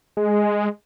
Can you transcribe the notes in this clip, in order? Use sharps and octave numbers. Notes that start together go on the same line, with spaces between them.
G#3